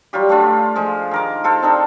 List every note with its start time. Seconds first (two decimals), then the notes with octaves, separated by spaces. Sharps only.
0.13 F#3 G3 F4 G4
0.29 A3 D4 F4
0.76 F3 G#3
1.11 D#3 A#4 D6
1.44 F4 A4 C5
1.62 C4 D4 D#4 A4